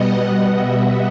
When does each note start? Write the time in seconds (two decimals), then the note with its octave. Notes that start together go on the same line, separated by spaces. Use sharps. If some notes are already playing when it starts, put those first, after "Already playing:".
Already playing: B2 G3 B3 D#5 F#5
0.19 F#5
0.49 E5